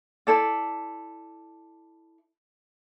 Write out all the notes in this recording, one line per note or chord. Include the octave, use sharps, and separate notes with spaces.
E4 A4 D5